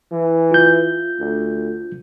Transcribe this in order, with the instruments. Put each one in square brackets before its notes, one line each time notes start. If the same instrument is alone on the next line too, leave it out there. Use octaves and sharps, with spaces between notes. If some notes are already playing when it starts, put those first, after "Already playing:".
[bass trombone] E3
[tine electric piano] F4 G6
[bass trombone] D2